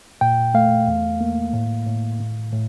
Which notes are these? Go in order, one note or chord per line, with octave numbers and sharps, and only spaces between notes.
A#2 G5
A3 F5
E2
A#3
A2
A2
A2
A2